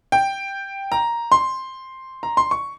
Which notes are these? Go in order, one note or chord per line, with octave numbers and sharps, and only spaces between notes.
G5
A#5
C6
A#5
C6
C#6